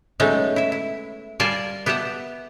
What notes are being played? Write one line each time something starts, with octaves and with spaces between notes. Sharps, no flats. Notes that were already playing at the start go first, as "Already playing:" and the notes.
F#3 G#3 A3 B3 C#4 D#4
E4 E5
E4
G3 F4 A#4 D5 G#5 A5
B3 G4 E5 F#5 A5